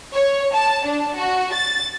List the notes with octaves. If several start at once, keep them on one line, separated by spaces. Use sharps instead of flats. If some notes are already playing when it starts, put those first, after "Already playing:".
C#5
A5
D4
F#4
A6